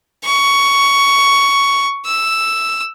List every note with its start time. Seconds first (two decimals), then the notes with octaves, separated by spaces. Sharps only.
0.25 C#6
2.06 E6